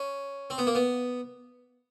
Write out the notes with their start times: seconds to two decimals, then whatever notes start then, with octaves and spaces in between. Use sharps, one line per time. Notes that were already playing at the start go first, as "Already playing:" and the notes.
Already playing: C#4
0.50 C4
0.58 B3
0.67 A#3
0.75 B3